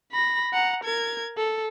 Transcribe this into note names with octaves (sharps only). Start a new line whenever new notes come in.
B5 A#6
F#5 A#5
A#4 G#6
A4